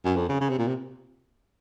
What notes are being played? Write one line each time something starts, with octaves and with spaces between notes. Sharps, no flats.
F#2
F2
C#3
C#3
C3
A#2
C3